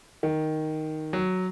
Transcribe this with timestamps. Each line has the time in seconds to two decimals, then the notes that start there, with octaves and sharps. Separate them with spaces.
0.23 D#3
1.13 F#3